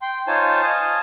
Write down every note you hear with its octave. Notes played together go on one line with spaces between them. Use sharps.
G5 C6
D#4 F4 C5 C#5 G#5 A5
D#5 F5 G#5 A5